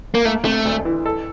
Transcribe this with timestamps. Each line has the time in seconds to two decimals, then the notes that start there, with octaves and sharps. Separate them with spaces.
0.15 A#3
0.25 A3 A#3
0.45 C3 A3
0.65 D2
0.85 E3
1.06 A4